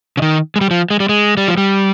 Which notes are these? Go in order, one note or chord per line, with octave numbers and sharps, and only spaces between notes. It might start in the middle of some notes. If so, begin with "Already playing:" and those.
C#3
D#3
G#3
G3
F3
G#3
G3
G#3
G3
F3
G3